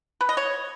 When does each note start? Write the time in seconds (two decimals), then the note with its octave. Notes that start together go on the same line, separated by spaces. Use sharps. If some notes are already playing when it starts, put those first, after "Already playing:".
0.21 B4
0.29 D#5
0.37 C#5